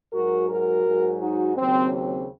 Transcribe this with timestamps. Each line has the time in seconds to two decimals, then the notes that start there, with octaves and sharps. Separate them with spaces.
0.12 G#2 F#3 F#4 A#4
0.49 F#4 A#4
0.85 G#2 F#3
1.20 D#4 F#4
1.57 D#2 C#3 F#3 C4
1.93 C4